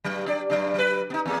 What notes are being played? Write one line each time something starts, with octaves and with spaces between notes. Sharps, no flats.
G2 F#3
D4 G4 D5
G2 F#3 D4
F#3 B4
B3 D#4
E2 A#3 G#4